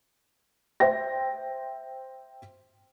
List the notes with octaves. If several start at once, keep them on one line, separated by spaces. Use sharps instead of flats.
C5 E5 G5 A#6